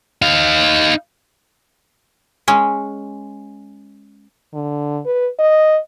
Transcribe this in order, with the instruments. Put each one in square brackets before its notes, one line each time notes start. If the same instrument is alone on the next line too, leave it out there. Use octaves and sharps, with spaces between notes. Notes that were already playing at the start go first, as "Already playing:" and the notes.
[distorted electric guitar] D#4 F5
[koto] G#3 C#4
[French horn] D3
B4
D#5